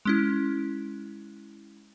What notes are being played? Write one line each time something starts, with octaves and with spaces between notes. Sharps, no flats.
G#3 C#4 E4